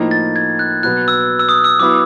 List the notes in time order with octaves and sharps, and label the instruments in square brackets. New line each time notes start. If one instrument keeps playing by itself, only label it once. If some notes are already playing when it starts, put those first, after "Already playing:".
Already playing: [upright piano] A2 F3 A#3 D#4
[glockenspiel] A6
G#6
F#6
[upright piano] B2 F#3 B3 [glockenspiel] F#6
[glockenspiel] E6
E6
D#6
E6
[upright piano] F#3 B3 E4 [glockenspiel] D6